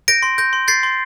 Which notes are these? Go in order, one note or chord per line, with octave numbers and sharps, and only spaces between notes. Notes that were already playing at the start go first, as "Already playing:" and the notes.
G6 A#6 D7
C6
G6 A#6
C6
G6 A6 C7
C6